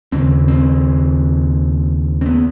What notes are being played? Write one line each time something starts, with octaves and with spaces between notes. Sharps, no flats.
D#2 C#3 C4
C4
C4
B3